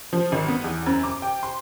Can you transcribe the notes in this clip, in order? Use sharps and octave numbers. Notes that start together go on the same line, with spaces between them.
F3
G#1
B3
E2
F#2
D6
G5
C6